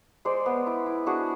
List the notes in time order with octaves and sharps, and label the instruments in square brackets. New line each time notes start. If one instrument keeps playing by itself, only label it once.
[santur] G#3 C5 D5
B3
E4
E4
D4 F#4 G#4